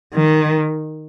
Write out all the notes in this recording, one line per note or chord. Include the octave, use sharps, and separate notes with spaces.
D#3